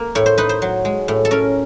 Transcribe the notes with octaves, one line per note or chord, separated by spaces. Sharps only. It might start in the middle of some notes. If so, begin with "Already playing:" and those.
Already playing: A#3
A2 C#5
C5
D#4 B4
C5
F#3
G#3
A2
A4
C#4 A#4